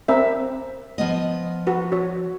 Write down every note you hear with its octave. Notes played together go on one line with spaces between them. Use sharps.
C4 A#4 E5
F3 B3 D#5
F#4 B4
F#4 C#5